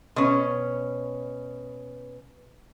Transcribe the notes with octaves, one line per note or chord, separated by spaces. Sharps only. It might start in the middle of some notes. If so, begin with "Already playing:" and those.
B2 C#4